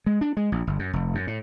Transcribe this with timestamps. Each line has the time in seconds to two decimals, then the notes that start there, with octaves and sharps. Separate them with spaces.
0.06 G#3
0.21 D4
0.37 G#3
0.52 A#1
0.67 G1
0.79 F#2
0.93 F1
1.15 F#2
1.27 A2